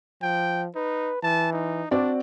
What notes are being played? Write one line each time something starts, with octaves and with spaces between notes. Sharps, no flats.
F3 G5
D#4 B4
E3 A5
D#4
C4 D4 F#4 D5